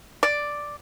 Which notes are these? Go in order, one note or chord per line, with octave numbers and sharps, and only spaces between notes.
D5